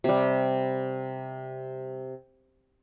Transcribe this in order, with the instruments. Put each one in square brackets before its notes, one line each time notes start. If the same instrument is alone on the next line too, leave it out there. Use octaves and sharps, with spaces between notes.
[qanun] C3 G3